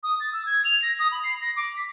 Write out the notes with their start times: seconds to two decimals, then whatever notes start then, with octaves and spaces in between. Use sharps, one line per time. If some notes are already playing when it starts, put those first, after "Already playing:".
0.03 D#6
0.20 A6
0.33 E6
0.46 G#6
0.65 F7
0.82 A#6
0.99 D#6
1.12 B5
1.23 C7
1.41 A#6
1.57 D6
1.76 B6